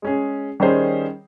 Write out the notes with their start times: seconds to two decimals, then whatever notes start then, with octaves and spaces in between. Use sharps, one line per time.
0.02 G#3 C#4 G#4
0.60 D#3 G3 C#4 G#4 C5